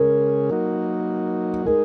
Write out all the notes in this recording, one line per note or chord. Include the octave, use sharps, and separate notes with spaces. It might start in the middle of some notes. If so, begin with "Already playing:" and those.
Already playing: C#3 G#3 C#4 G#4 A#4
F#3 A#3 D#4 F#4
G#3 D#4 G#4 A#4